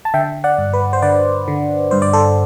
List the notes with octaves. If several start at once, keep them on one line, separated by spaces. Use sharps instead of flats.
A5
D3 E5 G5
D5 F#5
G2
B4
C5
D3 B4 D5
D3
G2 C5
D5
A4 C5